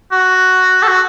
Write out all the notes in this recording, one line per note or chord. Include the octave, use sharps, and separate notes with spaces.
F#4
A4
F#4